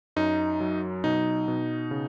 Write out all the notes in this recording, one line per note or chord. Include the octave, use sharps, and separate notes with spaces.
F#2 D#4
F#3
B2 D#4
B2
C#3